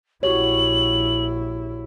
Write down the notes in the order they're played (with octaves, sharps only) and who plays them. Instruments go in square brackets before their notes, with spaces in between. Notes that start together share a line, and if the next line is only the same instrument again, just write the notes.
[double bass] A#1 E4 [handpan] F#4 G4 C#5 [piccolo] F#7